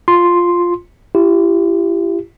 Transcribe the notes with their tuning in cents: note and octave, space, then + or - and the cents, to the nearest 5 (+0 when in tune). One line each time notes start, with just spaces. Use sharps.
F4 +0 C6 +0
E4 +40 G4 +0